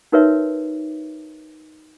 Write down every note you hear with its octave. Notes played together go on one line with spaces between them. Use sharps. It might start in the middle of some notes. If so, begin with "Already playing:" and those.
D#4 F#4 A#4 B4 C#5 E5